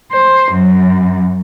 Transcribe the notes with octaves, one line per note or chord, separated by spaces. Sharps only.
C5
F#2